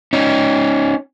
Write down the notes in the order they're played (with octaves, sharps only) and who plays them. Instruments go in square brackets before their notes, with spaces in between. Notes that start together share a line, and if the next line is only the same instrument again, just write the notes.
[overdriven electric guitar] C#4 D#4